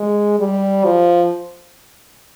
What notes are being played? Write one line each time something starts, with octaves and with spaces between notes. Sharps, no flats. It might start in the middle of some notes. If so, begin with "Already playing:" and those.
Already playing: G#3
G3
F3